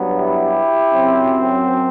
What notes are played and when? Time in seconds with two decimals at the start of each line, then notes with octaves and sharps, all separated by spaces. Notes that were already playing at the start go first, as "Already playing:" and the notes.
Already playing: G2 F#3 B3
0.15 E4 G4
0.91 F#2 F#3 C4